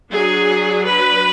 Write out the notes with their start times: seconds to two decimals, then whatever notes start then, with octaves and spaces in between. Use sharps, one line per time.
0.11 F#3 D4 G#4
0.87 B4